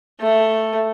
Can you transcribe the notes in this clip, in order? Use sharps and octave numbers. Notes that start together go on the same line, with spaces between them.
A3